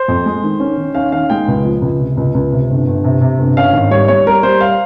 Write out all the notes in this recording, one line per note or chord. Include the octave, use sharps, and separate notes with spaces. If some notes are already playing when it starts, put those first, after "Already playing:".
Already playing: C5
F2
G#3
D#3
C#4
D#3
C#4 F5
D#3 F5
G#3 G5
C#2
F3
C#2
C3
C#2
C#2
C3
G1
G1
C3
C3
G1
C#4 F5
G#1
G3 C#5
G3 C#5
G3 A#4
G3 C5
F5